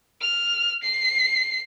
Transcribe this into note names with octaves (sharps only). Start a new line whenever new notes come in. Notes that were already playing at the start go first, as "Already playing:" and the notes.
F6
C7